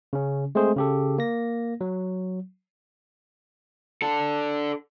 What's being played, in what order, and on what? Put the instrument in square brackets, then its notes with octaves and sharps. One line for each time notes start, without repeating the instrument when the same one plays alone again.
[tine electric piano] C#3 C#4
G#3 A3 C4 G#4 C5
C#3 G4 A4
A#3 A#6
F#3
[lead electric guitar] D4 A4